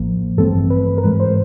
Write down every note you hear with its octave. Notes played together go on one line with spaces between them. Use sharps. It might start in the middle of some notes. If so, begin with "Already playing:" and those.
Already playing: A1 A2 F3 A#3
G2 E3 A3 C4 A4
B4
A#4
G#2 E3 G#3 B4
C5